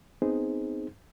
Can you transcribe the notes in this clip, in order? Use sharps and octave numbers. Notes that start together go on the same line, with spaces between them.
B3 C4 D#4 G#4 C5